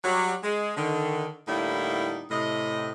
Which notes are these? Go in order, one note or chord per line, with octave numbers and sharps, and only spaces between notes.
F#3 G3
G#3
D3 D#3
A2 D3 G3 A#3 D#4 E4
A2 C3 D#5